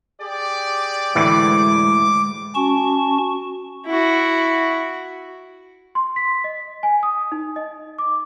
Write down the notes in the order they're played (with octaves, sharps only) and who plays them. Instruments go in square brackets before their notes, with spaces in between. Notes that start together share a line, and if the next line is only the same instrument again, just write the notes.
[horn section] G4 G#4 D5
[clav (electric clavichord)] D2 A2 E3 [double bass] G#3 [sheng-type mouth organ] D6
[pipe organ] C#4 F#4 A5 C#6
[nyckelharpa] E4 F#4
[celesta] C6
B6
D#5
G#5
D#6
D#4
D#5
D6